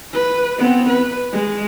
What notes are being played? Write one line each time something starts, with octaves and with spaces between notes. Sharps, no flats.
B4
B3 C4
B4
G#3